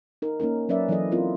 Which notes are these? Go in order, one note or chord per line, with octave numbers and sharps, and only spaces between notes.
D#4 A#4
A#3 C#4 D#4 A#4
F#3 C#4 A#4 B4 D5 E5
E3 F#3 E4 A4 D#5
C4 C#4 E4 F4 A#4